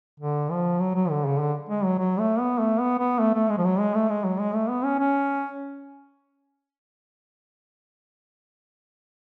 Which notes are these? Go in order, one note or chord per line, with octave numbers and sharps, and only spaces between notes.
D3
F3
F#3
F#3
D3
C#3
D3
G#3
F#3
F#3
A3
B3
A3
B3
B3
A3
A3
G#3
F3
F#3
G#3
A3
G#3
F#3
G#3
A3
B3
C#4
C#4